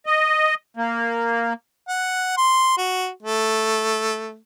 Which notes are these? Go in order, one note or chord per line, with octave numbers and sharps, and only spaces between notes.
D#5
A#3
F#5
C6
F#4
A3